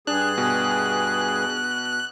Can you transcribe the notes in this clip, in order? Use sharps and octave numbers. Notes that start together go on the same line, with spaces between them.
G2 D4 G#4 F#6
B2